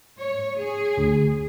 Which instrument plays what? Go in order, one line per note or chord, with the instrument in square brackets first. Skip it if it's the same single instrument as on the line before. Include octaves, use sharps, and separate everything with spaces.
[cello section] C#5
G#4
[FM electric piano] D2